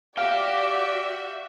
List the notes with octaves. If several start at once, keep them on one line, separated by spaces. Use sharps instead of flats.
F#4 G4 D5 E5 F5 G5